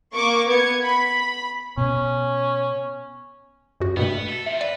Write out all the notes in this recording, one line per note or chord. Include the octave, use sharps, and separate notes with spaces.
A#3 C#6 D6
B3 G#6 C#7
B5
B2 C#4
F#2 F#4
G2 B2 A3 B3
A4
D#3 F3 E5
B4 D5